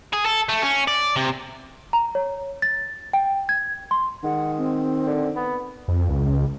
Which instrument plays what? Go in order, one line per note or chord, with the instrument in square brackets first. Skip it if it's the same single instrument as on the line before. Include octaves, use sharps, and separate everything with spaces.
[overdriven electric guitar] G#4
A4
A3
C#4
D5
C3
[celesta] A#5
C#5
A6
G5
G#6
C6
[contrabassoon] D#3 [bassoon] G#3 [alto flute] F#5
[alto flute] C4
[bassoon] D3
B3
[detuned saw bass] F2
C#2